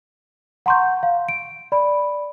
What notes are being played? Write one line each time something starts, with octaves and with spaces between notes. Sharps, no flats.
F#5 A#5 C6 C#6 G6
F5
D7
D5 B5